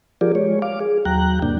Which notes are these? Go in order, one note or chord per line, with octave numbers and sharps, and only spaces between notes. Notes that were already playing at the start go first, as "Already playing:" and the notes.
F3 F4 G4 G#4 A#4 D5
G#3 C#5
F5 D6
G#4
D#2 F#3 G5 A#5 F#6
G2 C3 A#3 D4 G5